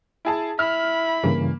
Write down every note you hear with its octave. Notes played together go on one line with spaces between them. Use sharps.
E4 G#4 A5
E4 B5 F6
G2 C#3 E3 A#3